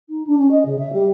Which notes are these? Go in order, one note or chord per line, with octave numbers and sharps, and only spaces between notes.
D#4
D4
C#4
D#5
C#3
E5
G3